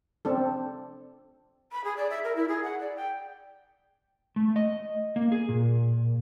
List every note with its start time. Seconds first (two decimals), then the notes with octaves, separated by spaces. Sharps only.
0.25 C4 D4 A4
1.72 B5
1.84 G#4
1.97 D5
2.10 E5
2.24 A#4
2.36 E4
2.48 G#4
2.63 F#5
2.80 D5
2.96 G5
4.36 A3
4.56 D#5
5.16 A#3
5.32 G#4
5.49 A#2